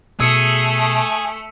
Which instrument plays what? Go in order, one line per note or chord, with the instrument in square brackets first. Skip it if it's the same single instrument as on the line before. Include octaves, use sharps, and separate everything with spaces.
[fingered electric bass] B2 [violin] A3 [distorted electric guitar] G#4 [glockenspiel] E6 C#7 D#7